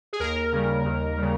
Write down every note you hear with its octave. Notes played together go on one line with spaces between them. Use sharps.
G#4
D#2 A#4
C#3 G3
D#2
C#3 G3